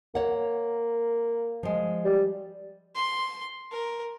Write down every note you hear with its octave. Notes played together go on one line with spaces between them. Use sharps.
A#3 C#5 F#5
F3 G#3
G3
C6
A#4